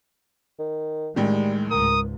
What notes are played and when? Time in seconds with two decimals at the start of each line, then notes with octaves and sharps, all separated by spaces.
0.59 D#3
1.16 A1 A2 D#3 G3 G#3
1.71 C#2 G#2 A#4 D#6